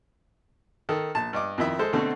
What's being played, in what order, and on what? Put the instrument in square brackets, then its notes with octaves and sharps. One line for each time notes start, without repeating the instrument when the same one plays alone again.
[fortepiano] D#3 A4
A#1 A5
G2 D#5 D6
F2 D#3 E4 E5
G#3 A4 C5
B2 D3 A3 C4 F#4 A4